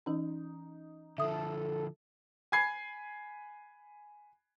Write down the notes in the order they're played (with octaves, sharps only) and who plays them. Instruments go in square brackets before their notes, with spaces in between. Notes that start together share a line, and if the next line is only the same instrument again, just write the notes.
[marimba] E3 C#4 [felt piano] D#4
[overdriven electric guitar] D3 F3 [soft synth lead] A4 [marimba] E5 D#6
[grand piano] G#5 B5 G#6 C7